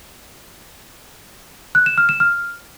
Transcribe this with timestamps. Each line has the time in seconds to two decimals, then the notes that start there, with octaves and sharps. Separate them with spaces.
1.75 F#6
1.86 E7
1.98 F6
2.09 E7
2.20 F6